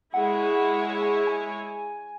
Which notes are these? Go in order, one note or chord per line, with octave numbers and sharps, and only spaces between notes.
G#3 E4 G#4 C#5 F#5
G#5
G#5